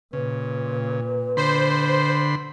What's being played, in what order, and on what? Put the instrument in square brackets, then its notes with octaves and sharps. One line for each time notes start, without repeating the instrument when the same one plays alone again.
[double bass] A#2 [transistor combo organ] C#3 [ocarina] B4
[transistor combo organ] D3 B5 C6 [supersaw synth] C5